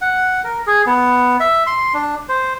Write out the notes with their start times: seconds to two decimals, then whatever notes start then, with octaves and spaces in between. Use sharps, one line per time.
0.01 F#5
0.44 A#4
0.67 G#4
0.86 B3
1.40 E5
1.67 C6
1.94 D4
2.29 C5